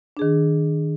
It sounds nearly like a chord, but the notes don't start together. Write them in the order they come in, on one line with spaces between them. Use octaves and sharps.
D4 G#4 D#3